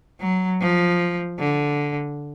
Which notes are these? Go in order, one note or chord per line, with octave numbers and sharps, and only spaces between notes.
F#3
F3
D3